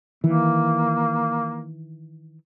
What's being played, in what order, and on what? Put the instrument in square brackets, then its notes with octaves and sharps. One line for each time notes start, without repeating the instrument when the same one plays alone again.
[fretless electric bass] D#3 E3 [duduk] A#3